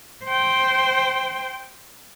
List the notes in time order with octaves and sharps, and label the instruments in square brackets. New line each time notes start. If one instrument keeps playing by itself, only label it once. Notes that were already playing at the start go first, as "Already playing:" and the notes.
[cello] C5 G5